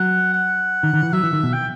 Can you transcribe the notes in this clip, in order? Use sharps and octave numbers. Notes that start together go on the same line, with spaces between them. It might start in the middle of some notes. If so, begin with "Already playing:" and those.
Already playing: F#3 F#5
F#5
D#3
D#3
E3
F#3 E5
E3
D#3
B2
G5